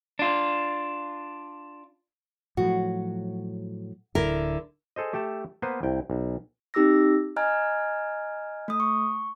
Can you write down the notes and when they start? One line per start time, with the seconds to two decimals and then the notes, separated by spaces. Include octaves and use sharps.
0.19 D4 F4
2.57 A2 F3 F#3 F#4
4.15 D1 D3 E4 A#4
4.96 G#4 A4 C5 D#5
5.13 A3 G4 A4 A5
5.62 A#3 B3 B4 C5
5.83 C2 G5
6.10 B1
6.74 C4 D#4 G4 D6 E6 A#6
7.36 D#5 G#5 A#5 F6 F#6 G#6
8.68 A3 D#6
8.80 C#6